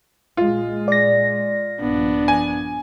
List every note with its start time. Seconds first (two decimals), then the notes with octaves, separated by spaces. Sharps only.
0.37 A#2 G#3 F4
0.88 D5 A#6
1.80 A#1 G2 F3 B3 D4
2.28 G#5